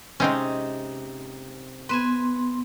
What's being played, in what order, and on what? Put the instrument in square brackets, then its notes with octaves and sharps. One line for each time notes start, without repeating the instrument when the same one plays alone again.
[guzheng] C3 D#4 [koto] G#3 C4 C#4
[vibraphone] B3 C6 [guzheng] B4 G#5